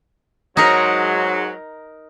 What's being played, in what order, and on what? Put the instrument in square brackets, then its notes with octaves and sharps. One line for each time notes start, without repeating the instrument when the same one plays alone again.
[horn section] G#2 F#3 [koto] D#4 A#4